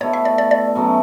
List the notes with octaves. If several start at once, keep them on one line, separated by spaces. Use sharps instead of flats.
B2 A3 E4 C#5
E5
D5
D5
D5
B2 F#3 A3 C#4